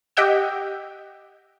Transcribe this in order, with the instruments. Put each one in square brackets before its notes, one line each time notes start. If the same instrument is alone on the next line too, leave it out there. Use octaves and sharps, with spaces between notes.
[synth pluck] G4 D#5 F#5 G5 E6